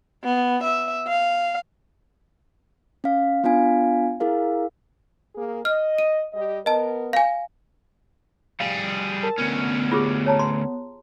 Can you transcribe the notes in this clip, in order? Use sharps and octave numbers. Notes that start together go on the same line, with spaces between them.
B3
E5
F5
C#4 F5
B3 D4 F4 F5 G#5
E4 G#4 A#4 F5
A#3 G#4
D#5 F6
D#7
G3 G4 D#5
B3 A#4 D#5 A5
F5 G#5
G3 G#4 F5
A#4 A5
D2 B3 C#4
F4 G4 G#4
C#5 A5 A#5
A#5 C6